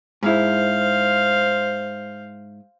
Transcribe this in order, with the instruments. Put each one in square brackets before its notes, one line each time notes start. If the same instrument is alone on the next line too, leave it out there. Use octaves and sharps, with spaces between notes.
[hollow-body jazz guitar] G#2 E4 [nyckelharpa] C5 F5